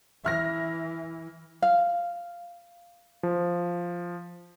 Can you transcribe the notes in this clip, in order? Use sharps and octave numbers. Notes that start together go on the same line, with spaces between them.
E3 E5 F6 A#6
F5
F3